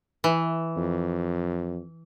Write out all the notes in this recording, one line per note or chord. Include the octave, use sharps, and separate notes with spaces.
E3
F2